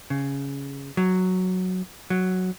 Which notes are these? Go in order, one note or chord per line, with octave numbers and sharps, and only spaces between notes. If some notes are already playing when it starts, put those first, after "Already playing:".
C#3
F#3
F#3